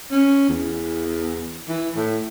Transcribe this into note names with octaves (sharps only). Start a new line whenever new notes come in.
C#4
E2
E3
A2